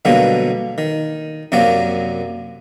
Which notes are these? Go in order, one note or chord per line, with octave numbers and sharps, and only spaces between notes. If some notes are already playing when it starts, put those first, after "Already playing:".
B2 D3 F#3 G3 A#3
D#3
F#2 C3 F#3 A#3 D5